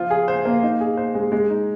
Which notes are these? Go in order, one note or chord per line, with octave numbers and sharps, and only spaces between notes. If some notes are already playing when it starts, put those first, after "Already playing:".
Already playing: F3 F4
G#4
C5
A#3
D#4
G#4
C5
G#3
G#3
D#4